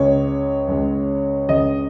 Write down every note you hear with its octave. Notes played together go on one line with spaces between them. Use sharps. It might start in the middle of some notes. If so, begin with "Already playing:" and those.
Already playing: C#2 C#3 G#3 C#5
C#2 C#3 G#3
C#2 C#3 G#3 D#5